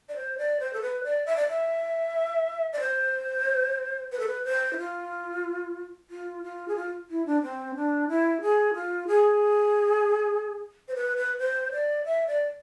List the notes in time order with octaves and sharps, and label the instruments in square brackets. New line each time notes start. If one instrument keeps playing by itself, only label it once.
[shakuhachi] D5
C5
D5
C5
A4
B4
D5
E5
D5
E5
D5
C5
B4
A4
B4
C5
E4
F4
F4
F4
G#4
F4
E4
D4
C4
D4
E4
G#4
F4
G#4
C5
B4
B4
C5
D5
E5
D5